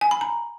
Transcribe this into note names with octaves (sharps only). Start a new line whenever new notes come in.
G#5
B5
A#5